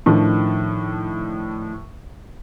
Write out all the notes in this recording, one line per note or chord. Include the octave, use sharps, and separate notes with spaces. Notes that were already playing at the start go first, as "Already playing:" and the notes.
A2 D#3 F3 D4